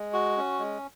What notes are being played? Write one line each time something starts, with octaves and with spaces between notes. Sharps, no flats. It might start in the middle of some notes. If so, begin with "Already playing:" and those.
Already playing: G#3
F#4
C#4
G#3